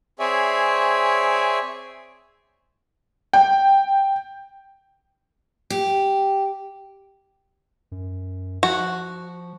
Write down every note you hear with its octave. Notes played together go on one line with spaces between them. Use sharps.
C4 G#4 C#5 D5 E5 G#5
G5
G4
F#2
F3 F#4